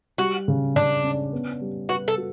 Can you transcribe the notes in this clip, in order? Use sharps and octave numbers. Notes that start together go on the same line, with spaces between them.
G3 F#4
C#3
C#3 D4
C#4
B3
G3
F#4 B4
A4
F#4